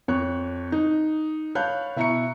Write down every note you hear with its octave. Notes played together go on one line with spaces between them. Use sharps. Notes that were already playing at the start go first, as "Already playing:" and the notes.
F2 C#5 C#6 F#6
D#4
C#5 F5 A5 B5 F#6 G6
B2 E4 E5 A#5 C#6 C#7